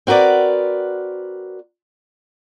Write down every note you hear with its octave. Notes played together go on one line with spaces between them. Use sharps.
C4 F#4 A#4 B4 D5